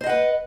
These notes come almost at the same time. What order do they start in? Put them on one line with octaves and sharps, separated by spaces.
C5 D#5 F#5 B4